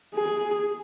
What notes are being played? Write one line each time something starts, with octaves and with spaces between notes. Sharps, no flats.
G#4